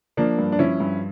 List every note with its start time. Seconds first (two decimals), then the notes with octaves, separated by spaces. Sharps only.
0.17 F3 A#3 D4
0.38 G2
0.52 D4
0.59 F3 C#4 E4
0.80 G2